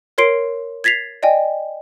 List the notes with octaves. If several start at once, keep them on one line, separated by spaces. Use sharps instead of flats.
A#4 C#5 C6 C7 D7
G#6 A6 B6 C7 F7
D5 D#5 G5 G#5